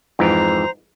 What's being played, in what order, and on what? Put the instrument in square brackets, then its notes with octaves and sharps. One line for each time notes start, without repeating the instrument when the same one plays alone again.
[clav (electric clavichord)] F2 G#2 E3 [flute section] C5 A#5